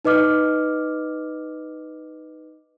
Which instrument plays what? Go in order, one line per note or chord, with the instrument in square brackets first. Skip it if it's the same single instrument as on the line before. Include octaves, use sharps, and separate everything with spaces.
[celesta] D#4 B4 D#5 D6 F6